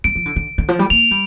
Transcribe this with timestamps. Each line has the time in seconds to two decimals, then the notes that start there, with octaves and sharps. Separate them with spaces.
0.04 G3 D7
0.15 F3
0.26 D3
0.36 D3
0.58 D3
0.68 F3
0.79 G3
0.90 A#3 F7
1.11 G3